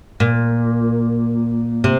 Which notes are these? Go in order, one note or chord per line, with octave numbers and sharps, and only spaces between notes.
A#2
C3